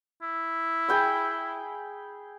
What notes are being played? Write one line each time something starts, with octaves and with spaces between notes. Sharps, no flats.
E4
G#4 G5 B5